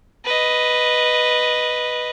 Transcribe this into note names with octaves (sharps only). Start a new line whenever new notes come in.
B4 D#5